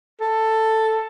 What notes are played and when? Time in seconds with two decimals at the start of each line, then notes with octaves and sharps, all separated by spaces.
0.21 A4